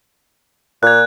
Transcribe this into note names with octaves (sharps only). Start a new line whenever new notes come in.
A#2 F#6 G#6